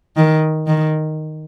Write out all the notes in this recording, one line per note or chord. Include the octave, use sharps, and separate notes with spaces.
D#3
D#3